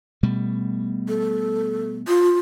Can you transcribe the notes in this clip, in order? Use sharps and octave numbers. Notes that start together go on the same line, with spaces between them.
B2 G3 A3
A4
F4